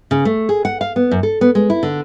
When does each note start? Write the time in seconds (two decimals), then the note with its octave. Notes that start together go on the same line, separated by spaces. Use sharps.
0.11 C#3
0.25 A3
0.49 G#4
0.65 F#5
0.81 F5
0.96 B3
1.11 F#2
1.23 A4
1.41 B3
1.55 G#3
1.70 E4
1.83 D3